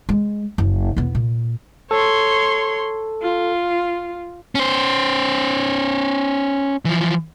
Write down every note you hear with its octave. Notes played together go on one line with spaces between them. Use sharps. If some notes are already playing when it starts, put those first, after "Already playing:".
G#3
F#1
E1 B3
A#2
A4 C#5 C6
F4
C#4 C5
E3 F3